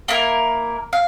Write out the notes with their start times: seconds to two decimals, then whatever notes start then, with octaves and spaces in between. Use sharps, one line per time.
0.08 A#3 E4 A#4
0.93 F5